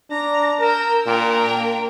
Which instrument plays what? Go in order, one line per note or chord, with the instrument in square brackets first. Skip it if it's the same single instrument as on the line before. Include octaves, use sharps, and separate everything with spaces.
[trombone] D4 [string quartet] A#5
[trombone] A#4 [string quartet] A#5 E6 G6
[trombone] A#2 [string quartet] D4 A#4 G5
[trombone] A#3